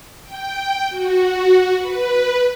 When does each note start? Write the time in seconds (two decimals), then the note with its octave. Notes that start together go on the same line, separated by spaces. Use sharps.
0.24 G5
0.90 F#4
1.78 B4